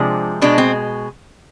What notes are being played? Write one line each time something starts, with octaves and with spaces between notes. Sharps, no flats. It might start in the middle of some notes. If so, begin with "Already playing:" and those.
Already playing: C3 F3 G#3 D4
B2 G#3 D4
C4